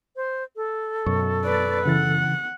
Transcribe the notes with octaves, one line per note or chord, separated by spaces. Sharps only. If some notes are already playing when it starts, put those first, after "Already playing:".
C5
A4
F#2 B2 C#6
B4 D5
C#3 E3 F#5 A6